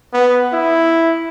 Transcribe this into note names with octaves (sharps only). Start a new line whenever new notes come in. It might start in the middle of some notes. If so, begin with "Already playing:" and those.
B3
E4